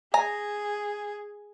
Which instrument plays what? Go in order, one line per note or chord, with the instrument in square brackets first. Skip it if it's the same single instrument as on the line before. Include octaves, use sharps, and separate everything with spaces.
[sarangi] G#4 [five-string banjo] G#5 A#5